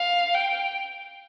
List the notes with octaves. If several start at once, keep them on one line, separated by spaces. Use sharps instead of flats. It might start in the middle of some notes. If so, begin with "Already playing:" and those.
Already playing: F5
G5